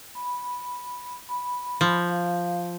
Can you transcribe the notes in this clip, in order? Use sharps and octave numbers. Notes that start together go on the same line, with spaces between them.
B5
B5
F3
F5